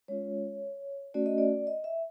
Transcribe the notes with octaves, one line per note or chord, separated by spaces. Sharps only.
G#3 C#4 F4 C#5
A3 C#4 F#4 D5
D#5
D5
D#5
E5